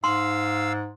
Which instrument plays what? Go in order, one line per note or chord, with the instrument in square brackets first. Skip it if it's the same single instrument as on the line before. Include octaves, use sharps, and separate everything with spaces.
[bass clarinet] G#2 [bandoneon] F5 E6 [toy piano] C6